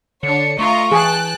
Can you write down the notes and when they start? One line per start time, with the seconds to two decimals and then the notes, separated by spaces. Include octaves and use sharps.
0.23 D3 D4 C#5 C#7
0.59 A3 F4 D#5 A#5 C#6
0.91 E3 G#4 G5 A5 F#6